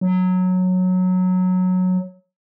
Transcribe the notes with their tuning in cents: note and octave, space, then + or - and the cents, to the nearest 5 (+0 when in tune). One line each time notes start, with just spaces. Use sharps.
F#3 -10